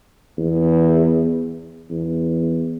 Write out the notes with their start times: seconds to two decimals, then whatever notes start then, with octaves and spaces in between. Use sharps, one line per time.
0.38 E2
1.90 E2